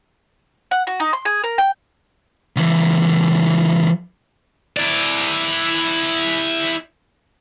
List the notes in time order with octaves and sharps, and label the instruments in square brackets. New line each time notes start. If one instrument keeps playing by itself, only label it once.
[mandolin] F#5
F#4
D#4
C6
G#4
A#4
G5
[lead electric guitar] C#2 E3
[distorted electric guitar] E4 D5